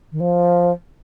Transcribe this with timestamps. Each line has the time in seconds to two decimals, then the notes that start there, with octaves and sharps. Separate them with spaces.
0.12 D#3
0.20 F3